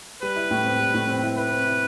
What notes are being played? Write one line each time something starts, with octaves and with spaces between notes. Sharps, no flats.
G3 B4
E4
A2
C4
G3
A2
C4
E4
E4 B4
C4
E4